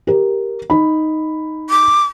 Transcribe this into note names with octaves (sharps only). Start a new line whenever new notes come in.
G4 A#4
D#4 B5
D6